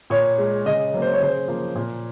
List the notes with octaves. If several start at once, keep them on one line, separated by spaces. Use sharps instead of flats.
A#2 C#5
G#3
C#3 D#5
F#3 A#3
C5
C#5
C#3 C5
F3 A#3
A#2